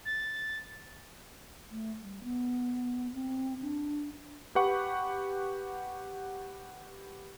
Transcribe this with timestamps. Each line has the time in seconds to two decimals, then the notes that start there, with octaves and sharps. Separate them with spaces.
0.05 A6
1.71 A3
2.02 G3
2.24 B3
3.13 C4
3.62 D4
4.55 G4 B4 F#5 C#6